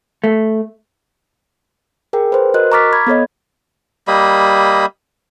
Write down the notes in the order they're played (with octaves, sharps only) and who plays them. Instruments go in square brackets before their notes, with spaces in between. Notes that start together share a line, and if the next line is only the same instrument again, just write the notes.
[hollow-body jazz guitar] A3
[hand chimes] G#4 A#4 G5
B4 C5
F#4 A#4 D#5 F#6
A#5 C#6 D6 F6 A6 B6
B5 G#6
B3 A4 C#5 D#5
[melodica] G3 A#3 D#5 B5